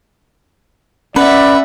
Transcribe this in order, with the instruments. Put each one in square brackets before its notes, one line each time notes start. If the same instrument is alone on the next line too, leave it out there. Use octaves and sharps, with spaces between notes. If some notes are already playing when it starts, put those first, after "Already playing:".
[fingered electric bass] C#4 [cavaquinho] B4 [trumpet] D5 [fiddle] E5 F#5